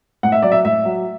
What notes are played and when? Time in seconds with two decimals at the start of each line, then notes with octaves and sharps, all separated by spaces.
0.23 A2 F#5
0.32 E5
0.42 F#3 D5
0.52 E5
0.65 A2 E5
0.85 F#3